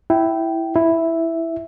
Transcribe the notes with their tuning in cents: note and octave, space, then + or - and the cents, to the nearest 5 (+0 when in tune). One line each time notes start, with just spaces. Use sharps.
E4 +0 G5 -15
E4 +0 E5 +0